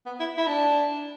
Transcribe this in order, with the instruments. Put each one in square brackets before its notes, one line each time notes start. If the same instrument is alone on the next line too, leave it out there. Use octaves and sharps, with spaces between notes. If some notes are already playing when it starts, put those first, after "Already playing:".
[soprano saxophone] B3
E4
E4
D4